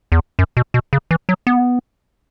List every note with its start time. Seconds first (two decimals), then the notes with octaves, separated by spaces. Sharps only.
0.12 E2
0.39 F#2
0.57 B2
0.74 B2
0.93 C#3
1.11 E3
1.29 F#3
1.47 B3